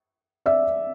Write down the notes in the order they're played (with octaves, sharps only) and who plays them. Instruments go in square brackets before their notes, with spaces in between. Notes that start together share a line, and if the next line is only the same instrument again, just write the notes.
[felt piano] D5 E5